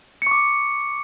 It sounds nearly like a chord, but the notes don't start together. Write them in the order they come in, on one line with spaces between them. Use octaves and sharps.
C#7 C#6 D6